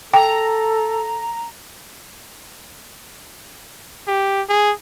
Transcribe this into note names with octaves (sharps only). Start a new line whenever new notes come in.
A4 G5 A#5
G4
G#4